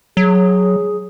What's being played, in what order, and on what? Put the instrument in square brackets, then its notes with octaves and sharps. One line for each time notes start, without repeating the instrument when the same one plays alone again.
[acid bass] F#3 [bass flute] G#4